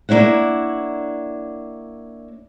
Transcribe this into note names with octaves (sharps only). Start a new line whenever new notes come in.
A#3 D4 E4 C#5 F#5